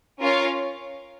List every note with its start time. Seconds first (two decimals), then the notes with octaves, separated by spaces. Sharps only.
0.20 C#4 F4 A#4 C#5 F5